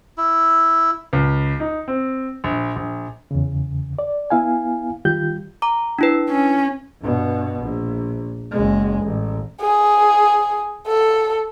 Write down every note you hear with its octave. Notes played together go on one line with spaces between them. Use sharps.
E4
C#2
D#4
C4
A#1
A#1
E2 C#3
D5
B3 E4 F5 G#5
D#3 G3 F4 G4 G6
A#5 D6
D4 E4 B4
C#4
G2 B2
A#1
F#1 G#3
A1
G#4
A4